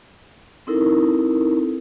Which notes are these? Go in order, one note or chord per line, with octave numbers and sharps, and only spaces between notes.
C4 D#4 E4 A4 A#4